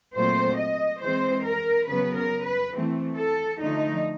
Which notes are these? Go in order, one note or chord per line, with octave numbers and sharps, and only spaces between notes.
A#2 F#3 A3 C4 C5
D#5
E3 G#3 C4 C5
A#4
C#3 F#3 B3 B4
A#4
B4
E3 A3 C4
A4
D3 F3 A3 D#4